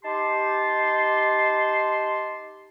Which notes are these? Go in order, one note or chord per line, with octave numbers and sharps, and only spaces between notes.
D#4 G4 A5 C6